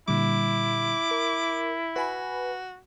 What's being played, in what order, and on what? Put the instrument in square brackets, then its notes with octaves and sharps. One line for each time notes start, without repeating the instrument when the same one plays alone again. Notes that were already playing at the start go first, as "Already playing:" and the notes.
[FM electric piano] A#2 D3 G3 [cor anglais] E4 [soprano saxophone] D6
[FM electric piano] A#4
[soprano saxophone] F#4 [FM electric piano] B4 G#5 B5